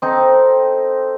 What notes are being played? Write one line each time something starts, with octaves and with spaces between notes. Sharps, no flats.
C4 D#4 A4